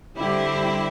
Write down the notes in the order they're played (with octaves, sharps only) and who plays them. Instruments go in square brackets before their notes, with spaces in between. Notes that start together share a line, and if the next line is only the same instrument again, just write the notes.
[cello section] D3 G3 C4 E4 G4